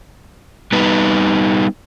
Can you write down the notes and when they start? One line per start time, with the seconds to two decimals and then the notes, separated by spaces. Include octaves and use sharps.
0.72 G3 B3 D#4 B4